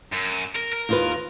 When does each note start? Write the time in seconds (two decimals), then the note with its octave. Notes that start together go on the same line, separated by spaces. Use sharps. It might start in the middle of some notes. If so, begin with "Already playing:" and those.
0.13 F#2
0.56 A#4
0.73 A#4
0.89 D#2 F4 B4